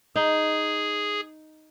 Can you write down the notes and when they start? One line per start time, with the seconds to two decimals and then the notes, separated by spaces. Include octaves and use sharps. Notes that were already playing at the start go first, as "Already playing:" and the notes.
0.16 D#4 G#4